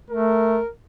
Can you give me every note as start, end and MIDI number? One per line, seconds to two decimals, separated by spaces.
0.10 0.59 57
0.10 0.68 70